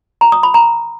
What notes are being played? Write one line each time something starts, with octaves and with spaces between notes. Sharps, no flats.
A#5
D#6
B5
A#5